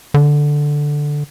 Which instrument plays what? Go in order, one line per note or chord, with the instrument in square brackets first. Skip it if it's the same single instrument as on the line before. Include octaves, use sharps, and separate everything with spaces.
[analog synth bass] D3